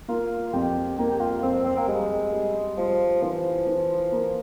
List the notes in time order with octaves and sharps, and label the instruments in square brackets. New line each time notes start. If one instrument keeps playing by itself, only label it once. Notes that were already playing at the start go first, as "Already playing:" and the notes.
[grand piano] A#3 [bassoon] F4
[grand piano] F2 [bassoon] G4
[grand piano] A#3 [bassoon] G4
[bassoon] G4
F4
[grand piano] F2 [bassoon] C4
[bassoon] C4
A#3
[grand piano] G3 [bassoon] G#3
[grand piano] G3
[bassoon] F3 [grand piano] G3
[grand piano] E3 [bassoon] F3
[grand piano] E3
A#3